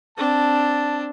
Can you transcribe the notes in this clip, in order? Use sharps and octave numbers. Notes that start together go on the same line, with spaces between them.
C4 D4 A5